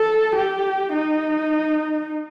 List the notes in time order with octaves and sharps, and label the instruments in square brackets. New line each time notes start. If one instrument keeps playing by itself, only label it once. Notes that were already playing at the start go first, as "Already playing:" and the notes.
Already playing: [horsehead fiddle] A4
G4
D#4